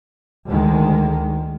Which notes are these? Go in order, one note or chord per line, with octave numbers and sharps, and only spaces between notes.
D2 D#3 G#3